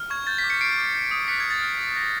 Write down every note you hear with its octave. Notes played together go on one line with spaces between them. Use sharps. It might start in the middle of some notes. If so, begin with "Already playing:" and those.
Already playing: F6
C#6 G#6
G6 A6
B6
D6
B6 C#7
G6 C7 D7
D6
G6
D#6
F#6 B6 C#7
G#6
D6
A6
F6
D6
G6 A#6